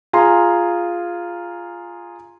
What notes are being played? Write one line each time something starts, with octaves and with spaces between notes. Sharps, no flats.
F4 G#4 G#5 A#5 C6